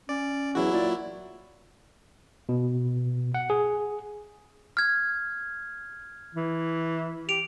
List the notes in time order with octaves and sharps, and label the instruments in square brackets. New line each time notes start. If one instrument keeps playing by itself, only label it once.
[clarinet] C#4 [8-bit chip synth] D5
[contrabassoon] E2 [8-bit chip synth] F#3 E4 F#4
[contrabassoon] A#2 [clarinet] D5
[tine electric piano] B2
F#5
G#4
[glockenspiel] F6 G#6
[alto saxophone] E3
[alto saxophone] G4 [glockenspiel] D7 F7